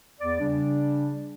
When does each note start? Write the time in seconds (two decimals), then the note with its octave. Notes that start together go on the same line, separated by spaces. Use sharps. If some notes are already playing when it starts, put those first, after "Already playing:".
0.20 E2 B3 D5
0.40 C#3 G3 D4